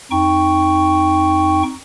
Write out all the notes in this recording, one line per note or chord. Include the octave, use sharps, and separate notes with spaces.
F2 D#4 G5 C#6